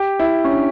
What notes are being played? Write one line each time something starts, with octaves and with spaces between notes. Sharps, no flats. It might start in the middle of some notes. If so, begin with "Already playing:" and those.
Already playing: G4
E4
C#4
D4